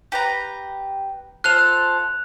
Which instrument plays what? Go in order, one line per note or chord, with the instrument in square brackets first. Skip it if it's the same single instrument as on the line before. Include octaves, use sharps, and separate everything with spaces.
[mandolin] G4 B4 A#5
[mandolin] F4 A4 C5 [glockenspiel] F#6 F7